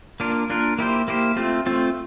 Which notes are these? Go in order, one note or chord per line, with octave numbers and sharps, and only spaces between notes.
A#3 D4 F4 A#4
A#3 D4 F4 A#4
A#3 E4 G4 C5
A#3 E4 G4 C5
A3 C4 F4
A3 C4 F4